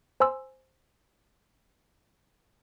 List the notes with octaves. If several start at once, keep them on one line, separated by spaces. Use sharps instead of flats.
C5 G#5 C6 E6